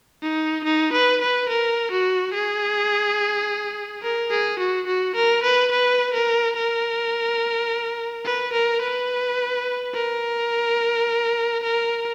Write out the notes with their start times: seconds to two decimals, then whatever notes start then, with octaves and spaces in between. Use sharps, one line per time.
0.22 D#4
0.64 D#4
0.93 B4
1.21 B4
1.49 A#4
1.91 F#4
2.33 G#4
4.02 A#4
4.31 G#4
4.59 F#4
4.87 F#4
5.15 A#4
5.43 B4
5.72 B4
6.14 A#4
6.56 A#4
8.25 B4
8.53 A#4
8.81 B4
9.94 A#4
11.63 A#4